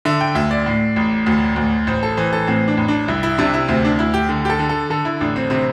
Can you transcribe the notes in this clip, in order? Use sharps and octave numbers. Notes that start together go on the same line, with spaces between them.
D3 E5
G5
D2 E5
D5
A2
A1
D2
D2
A1 C5
A4
E3 C5
A4
A2 C4
D4
A1
D4
C2 E4
E4
C3 D4
E4
D2 C4
D4
D2 E4
G4
D3
G4
A4
D3
A4
D3 A4
E4
A1 D4
C4
C3 C4